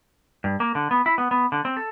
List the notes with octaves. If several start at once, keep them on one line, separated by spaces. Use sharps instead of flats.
G2
A#3
D3
B3
E4
B3
B3
D3
C4
A4